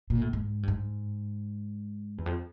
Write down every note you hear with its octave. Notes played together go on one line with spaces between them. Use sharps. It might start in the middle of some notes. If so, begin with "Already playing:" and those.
A#2
A2
G#2
G2
G#2
E2
F2